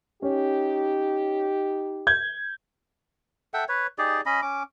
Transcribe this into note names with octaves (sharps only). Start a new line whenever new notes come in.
C#4 D#4 G4
G6 G#6
A4 E5 F#5 G5
B4 C#5
D#4 G4 G#4 D5
C#4 D#5 B5
C#4 D6